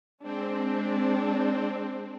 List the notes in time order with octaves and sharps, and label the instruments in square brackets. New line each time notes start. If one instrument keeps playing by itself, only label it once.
[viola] G#3 D4 [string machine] C4